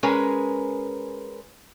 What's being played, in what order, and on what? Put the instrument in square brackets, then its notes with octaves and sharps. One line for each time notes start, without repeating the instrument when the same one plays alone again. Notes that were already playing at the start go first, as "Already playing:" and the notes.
[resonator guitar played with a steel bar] G#3 C#4 G#4 A#4 B4